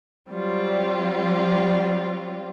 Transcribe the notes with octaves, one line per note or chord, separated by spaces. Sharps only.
F#3 G3 C4 F4